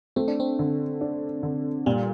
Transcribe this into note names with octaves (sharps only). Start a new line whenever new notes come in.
A3 C4
D4
C4
D3
D4
D3
A#2 G3